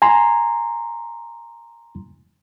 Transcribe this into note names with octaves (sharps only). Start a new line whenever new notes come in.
G#5 A#5 C6